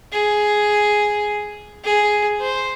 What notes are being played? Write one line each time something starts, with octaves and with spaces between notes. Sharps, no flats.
G#4
G#4
C5